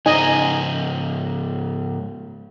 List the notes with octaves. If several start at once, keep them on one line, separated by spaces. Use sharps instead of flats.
G#2 C#3 D#4 C5 D#5 G#5